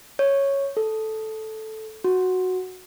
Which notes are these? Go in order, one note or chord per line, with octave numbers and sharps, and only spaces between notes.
C#5
A4
F#4